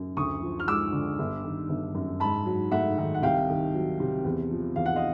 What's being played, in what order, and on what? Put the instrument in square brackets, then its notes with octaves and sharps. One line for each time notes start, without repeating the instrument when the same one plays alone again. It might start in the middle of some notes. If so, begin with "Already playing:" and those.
Already playing: [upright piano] F#2
D2 C#6 D#6
F3
F6
G#3 D6 E6
D3
G1
D#3
G1
F#2
G#2 A5 B5
F#3
A3 E5 F#5
D#3
F#5
C2 F5 G5
D#3
F#3
C3
E2
F3
E2 F5
F#5
D#5 F5